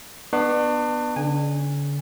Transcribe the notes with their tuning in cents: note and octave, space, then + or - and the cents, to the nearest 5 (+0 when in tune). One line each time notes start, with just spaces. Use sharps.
B3 -5 D4 +30 C#6 +0
D3 -45 G#5 -20